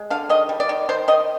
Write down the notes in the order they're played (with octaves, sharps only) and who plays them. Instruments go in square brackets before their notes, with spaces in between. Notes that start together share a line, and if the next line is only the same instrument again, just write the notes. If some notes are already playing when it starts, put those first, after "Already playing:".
Already playing: [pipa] G#3
D3 F5
D#3 D#5
G3
D5
D#3
D#3 C5
D#3 D#5